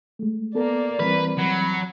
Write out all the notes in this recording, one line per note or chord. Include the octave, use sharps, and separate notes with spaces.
G#3 A3
A#3 B3 A4 A#4 D5
E3 G3 C4 B4
F#3 B5 C#7